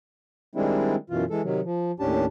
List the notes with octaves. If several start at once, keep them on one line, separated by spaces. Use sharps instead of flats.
D#3 G3 G#3 C4 D4 E4
F#2 B2 E3 F4
E3 G#3 A4
C3 D#3 F#3
F3
D#2 A2 C#4 D4 G4 A5